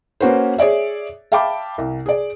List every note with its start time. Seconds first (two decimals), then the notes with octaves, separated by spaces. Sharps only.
0.21 A#3 C#4 F#4 B4 C5
0.58 G#4 C#5 D5 E5
1.32 E5 F5 G5 A5 B5 D6
1.78 C2
2.06 G#4 D5